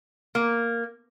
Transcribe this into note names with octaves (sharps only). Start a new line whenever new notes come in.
A#3